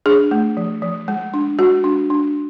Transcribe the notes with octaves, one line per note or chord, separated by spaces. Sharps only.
D4 G#4
A3
F3
F3
G#3
D4
G#3 F#4
D4
D4